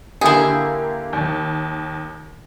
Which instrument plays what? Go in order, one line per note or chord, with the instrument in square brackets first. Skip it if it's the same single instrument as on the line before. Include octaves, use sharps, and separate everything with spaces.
[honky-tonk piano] D3 A#3 G4 [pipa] E4 G#4
[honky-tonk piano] D#2